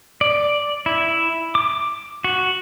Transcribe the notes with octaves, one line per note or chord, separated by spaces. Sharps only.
D5
E4
D6
F#4